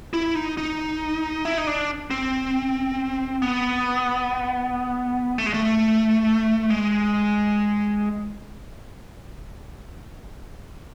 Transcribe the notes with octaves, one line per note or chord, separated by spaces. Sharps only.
E4
D#4
D#4
E4
D#4
D4
C4
B3
A3
G#3
A3
G#3